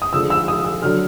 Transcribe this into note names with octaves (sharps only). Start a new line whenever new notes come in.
D#6
D3 F3 G#3 E6
E6
D#6
E6
D3 F#3 F6